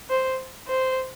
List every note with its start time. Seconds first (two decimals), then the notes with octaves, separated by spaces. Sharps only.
0.10 C5
0.68 C5